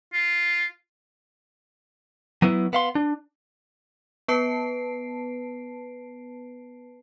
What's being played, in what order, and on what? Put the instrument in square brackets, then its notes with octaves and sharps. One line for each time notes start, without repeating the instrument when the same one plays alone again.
[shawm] F4
[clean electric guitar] F#3 B3 E4
B3 F5 C6
D4
[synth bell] B3 B4 A5 C7 D7